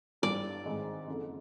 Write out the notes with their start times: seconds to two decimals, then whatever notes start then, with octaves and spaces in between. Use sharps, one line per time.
0.22 G1 G2 E3 G3 D5
0.65 G#1 G#2 D#3 G#3 C4
1.07 F#1 F2 D3